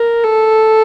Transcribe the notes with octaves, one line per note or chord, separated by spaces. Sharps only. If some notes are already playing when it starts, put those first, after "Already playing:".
Already playing: A#4
A4